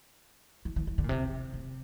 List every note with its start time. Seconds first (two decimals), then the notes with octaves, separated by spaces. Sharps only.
0.65 E3
0.76 E3
0.87 E3
0.98 D3
1.04 A#2
1.09 C3
1.53 C3